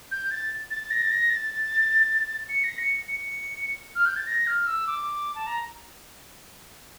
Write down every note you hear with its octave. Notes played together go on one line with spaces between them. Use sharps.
G6
A6
A6
A#6
A6
A#6
A6
C#7
A#6
C#7
C#7
F6
G6
A6
A#6
F6
E6
D6
A5
A#5